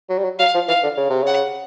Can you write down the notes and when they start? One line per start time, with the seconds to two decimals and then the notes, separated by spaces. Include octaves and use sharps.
0.10 F#3
0.18 G3
0.24 F#3
0.39 F#3 F5
0.55 F3
0.68 E3 F5
0.83 D3
0.97 C#3
1.10 C3
1.23 C#3 F#5